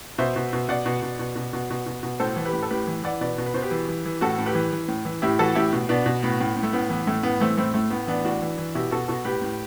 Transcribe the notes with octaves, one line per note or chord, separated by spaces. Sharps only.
B2 C5 E5
B2
B2
B2 D5 F#5
B2
B2
B2
B2
B2
B2
B2
B2
A2 A4 C5
E3
G4 B4
A2
A4
A2 G4 B4
E3
E3 D5 F#5
B2 B4 D5
B2
B4
B2 C5
G4 B4
E3
E3
E3
A2 F#4 A4
A2
G4 B4
E3
E3
A2
E3
A2 E4 G4
E3 F#4 A4
A2 E4 G4
B2
B2 B3 D4
B2
A2 B3
A2
A2
A3
A2 B3
E3 B3
A2 A3
A2 B3
E3 A3 C4
A2 A3 C4
A2 A3
A2 B3
E3 B3 D4
A2 D4 F#4
E3
E3
B2 E4 G4
B2 F#4 A4
B2 F#4 A4
A2 G4 B4
A2